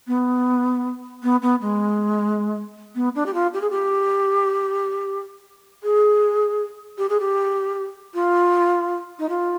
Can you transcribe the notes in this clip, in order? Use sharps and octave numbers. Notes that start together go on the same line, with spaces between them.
B3
B3
B3
G#3
B3
D4
G4
F4
G4
G#4
G4
G#4
G4
G#4
G4
F4
D#4
F4